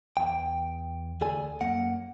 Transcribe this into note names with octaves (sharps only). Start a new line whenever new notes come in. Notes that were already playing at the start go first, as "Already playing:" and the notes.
E2 G5
D2 G#4 A4 D5 G#5
F#2 A#3 F#5